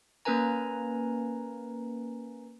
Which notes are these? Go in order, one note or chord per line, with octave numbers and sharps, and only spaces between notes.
A#3 C#4 A#4 B4 G#5 A#5